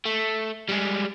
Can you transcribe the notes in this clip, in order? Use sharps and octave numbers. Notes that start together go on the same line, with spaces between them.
A3
G3 G#3